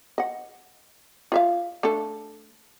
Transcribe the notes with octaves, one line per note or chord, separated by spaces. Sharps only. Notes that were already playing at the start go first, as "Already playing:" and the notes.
D#5 F#5
F4 E5 F5
A3 D4 A4